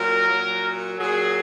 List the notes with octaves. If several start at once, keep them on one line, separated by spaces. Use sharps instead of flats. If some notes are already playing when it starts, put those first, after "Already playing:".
Already playing: A#2 F#3 A#4
A#2 F#3
A#2 F#3 G#4